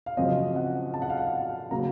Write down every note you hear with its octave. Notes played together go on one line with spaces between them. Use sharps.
F5
F#2 C#3 F3 C4 D#5
F#5
A5
F#5
F5
F#5
C#3 F#3 A#3 A#5